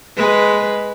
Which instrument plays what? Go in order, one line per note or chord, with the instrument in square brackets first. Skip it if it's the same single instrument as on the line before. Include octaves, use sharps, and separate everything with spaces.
[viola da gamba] G#3 B4